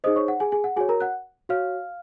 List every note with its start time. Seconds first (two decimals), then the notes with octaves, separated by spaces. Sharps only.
0.04 D#4 G#4 C5 D#5 D#6
0.16 C#5 C#6
0.28 F#5
0.40 G#4 G#5
0.52 G#4 G#5
0.64 F#5
0.77 F#4 G#4 C#5 G#5
0.89 A#4 A#5
1.00 F#5 F#6
1.49 F#4 C#5 F5 F6